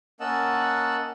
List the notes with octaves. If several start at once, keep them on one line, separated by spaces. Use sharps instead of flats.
A#3 C#4 D#5 F#5 A5 E6